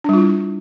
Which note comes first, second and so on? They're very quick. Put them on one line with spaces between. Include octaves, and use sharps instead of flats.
D4 G3 F4 E4